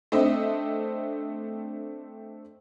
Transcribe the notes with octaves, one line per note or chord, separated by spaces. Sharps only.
A3 C4 D4 D#5 E5